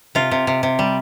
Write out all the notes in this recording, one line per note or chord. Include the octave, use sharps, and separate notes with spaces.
C3 F4
C3
C3
C3
G3